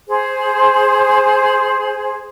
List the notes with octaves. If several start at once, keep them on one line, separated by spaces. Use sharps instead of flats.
G#4 C5